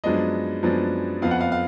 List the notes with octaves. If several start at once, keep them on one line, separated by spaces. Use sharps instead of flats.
F#2 F3 G#3 B3 D4 D#5
F#2 F3 G#3 B3 D4
F2 F3 B3 F5
F#5
F5
F5